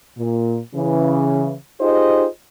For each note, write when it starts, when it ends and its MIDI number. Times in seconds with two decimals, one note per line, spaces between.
0.18 0.60 46
0.75 1.55 49
0.75 1.55 52
1.81 2.27 63
1.81 2.27 65
1.81 2.27 67
1.81 2.27 68
1.81 2.27 72
1.81 2.27 75